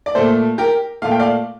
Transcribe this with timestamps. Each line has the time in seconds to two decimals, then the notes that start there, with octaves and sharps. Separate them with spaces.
0.06 D5
0.15 A#2 A3 A4 C5
0.58 G4 A#4
1.02 A#2 A3 F5
1.11 G5
1.20 D5 F5